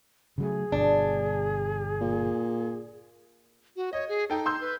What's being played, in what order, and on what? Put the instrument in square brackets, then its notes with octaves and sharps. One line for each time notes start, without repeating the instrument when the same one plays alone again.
[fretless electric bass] C#3 F#3 A3 [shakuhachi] G#4
[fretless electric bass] G1 B2 [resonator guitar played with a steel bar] D4
[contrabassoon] A#2
[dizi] F#4
[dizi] C#5 [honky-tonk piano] D#5
[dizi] G#4
[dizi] D#4 [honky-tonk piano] A4 G5
[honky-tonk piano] C6 E6 G6
[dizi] B4